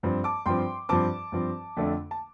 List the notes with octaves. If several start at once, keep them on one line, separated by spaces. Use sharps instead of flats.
G2 F3 C4
A5 D6
G2 F3 C4 G5 C6
G2 F3 C4 A5 D6
G2 F3 C4
F2 D3 A3 D4
A5